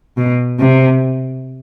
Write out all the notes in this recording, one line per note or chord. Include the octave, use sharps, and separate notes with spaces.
B2
C3